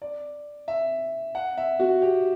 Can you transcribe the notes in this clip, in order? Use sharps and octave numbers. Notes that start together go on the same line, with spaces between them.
D5
E5
F#5
E5
F#4
G4